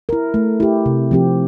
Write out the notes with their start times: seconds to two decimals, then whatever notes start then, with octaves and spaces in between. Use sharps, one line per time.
0.09 E4 A#4
0.34 A3
0.60 E4 G4
0.86 C3
1.11 F3 C4 G4